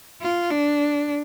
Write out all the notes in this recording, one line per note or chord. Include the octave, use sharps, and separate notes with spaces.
F4
D4